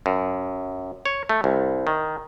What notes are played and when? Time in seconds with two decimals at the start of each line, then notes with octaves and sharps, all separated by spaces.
0.06 F#2
1.06 C#5
1.29 A3
1.44 C2
1.87 D#3